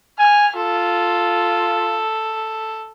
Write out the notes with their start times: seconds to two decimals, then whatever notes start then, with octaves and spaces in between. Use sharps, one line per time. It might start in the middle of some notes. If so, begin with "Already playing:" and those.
0.19 G#5 F6
0.55 F4 A4